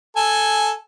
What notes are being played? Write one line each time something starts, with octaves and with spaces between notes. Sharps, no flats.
A4 G#5